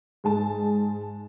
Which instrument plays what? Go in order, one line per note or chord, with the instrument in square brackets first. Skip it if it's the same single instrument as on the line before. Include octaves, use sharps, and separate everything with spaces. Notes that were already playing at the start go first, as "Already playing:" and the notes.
[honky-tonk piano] G#2 G#4 A5